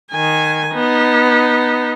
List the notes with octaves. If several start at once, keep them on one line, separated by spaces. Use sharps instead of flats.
D#3 G#5
B3 D#4